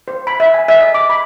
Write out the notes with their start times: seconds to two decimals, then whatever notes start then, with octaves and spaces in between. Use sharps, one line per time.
0.08 C5
0.27 B5
0.40 E5
0.54 G#5
0.68 E5
0.81 D#5
0.94 D6
1.10 B5